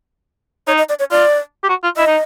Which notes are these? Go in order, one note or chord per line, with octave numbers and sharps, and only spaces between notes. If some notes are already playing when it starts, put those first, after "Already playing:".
D#4 C#5
D#5
D5
C#5
F4 D5
G4
F#4
F4
E4 D#5
D#4